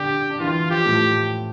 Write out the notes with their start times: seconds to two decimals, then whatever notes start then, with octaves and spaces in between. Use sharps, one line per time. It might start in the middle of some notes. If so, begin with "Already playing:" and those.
Already playing: D3 D4 G4
0.30 D4
0.39 E3 E4 F4
0.70 F3 F4 G4
0.85 A2 A3